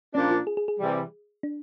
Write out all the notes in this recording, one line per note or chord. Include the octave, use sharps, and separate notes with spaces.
A#2 F3 A#3 C#4 D4
F4
G#4
G#4
G#4
C3 E3 G3
D4